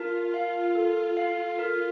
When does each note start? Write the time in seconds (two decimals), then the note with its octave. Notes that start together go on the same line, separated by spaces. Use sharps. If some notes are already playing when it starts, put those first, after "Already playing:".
Already playing: F4 A#4 A5
0.34 F5
0.75 A4
1.17 F5
1.59 A#4